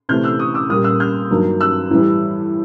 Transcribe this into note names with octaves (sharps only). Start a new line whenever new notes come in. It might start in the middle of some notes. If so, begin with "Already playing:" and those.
C3 E3 A3 C4 F6 G6
E6 F#6
C#6 D#6
D6 E6
A#2 G3 A#3 C#4 D#6 F6
E6 F#6
F6 G6
G2 D#3 F#3 A#3
E6 F#6
A2 E3 G3